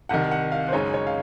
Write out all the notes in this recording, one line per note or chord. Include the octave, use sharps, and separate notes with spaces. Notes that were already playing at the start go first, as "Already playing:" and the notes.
C2 C3 D#3 F#5
F#5
F5
C5
F#2 C#3 G#3 D#4 C#5
C#5
F5